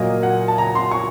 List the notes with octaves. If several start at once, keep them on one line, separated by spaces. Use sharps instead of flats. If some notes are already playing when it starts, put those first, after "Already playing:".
Already playing: A#2 F#3 A#3 D#5
F#5
A5
A#5
C6
C#6